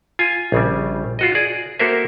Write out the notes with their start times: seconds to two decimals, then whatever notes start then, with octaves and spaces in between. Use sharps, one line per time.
0.19 F4 G#5
0.52 A#1 C#3 G3
1.19 F4 F#4 D#5
1.35 G#4 D5
1.79 A#3 F#4 A4 A#4 C5 E5